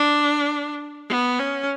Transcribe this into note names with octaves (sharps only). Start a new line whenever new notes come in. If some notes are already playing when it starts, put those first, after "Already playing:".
Already playing: D4
B3
C#4